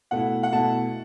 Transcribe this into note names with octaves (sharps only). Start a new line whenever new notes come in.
B2 A3 E4 F#5
F#5
B2 A3 E4 A5